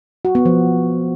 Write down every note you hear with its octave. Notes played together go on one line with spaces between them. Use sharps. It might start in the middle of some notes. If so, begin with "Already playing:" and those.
F#4
B3
F3